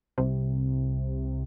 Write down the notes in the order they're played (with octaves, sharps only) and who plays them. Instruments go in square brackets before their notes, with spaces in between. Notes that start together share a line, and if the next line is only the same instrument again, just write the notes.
[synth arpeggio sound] C2 C3